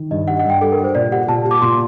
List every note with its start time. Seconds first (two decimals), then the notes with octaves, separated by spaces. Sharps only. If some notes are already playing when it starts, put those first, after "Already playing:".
Already playing: D#3
0.11 G2 D#5
0.28 G3 F#5
0.39 F#5
0.45 G2 G5
0.61 G3 A4
0.72 A#4
0.79 G3
0.84 C5
0.95 A#2 D5
1.12 G4 F#5
1.28 A#2 A5
1.45 G4
1.51 D6
1.62 A#2 C6